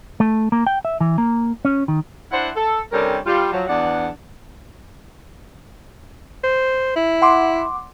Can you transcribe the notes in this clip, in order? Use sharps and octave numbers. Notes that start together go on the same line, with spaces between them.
A3
A#3
G5
E5
E3
A#3
C#4
D#3
D4 E4 C5 F#5
A4
C3 G3 C#4 D4 A4 A#4
G3 F4
F3 F#3
E2 D4 F#5
C5
E4
F#5 C6 D6